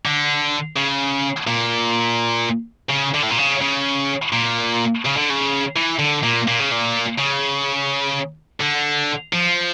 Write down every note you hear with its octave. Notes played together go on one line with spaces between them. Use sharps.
D3
C#3
A#2
C#3
D3
A2
A#2
C#3
C#3
A#2
C#3
D3
C#3
E3
D3
A#2
A#2
C#3
A#2
C#3
D3
F3